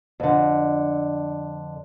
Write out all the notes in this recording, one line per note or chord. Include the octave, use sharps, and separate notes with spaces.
F2 D3